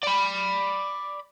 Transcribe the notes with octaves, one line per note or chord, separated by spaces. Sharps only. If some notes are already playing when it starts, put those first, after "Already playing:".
D5 B5